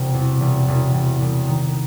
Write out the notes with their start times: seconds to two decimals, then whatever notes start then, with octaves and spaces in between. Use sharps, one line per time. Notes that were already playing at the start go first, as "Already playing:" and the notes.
Already playing: E1 C3
0.13 E2
0.41 E1
0.68 E1
0.94 E1
1.20 E1
1.48 D#3